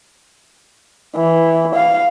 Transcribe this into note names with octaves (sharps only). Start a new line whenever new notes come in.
E3
F5